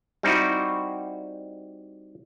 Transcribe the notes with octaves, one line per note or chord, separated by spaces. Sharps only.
G3 C4 D#4 E4 F#4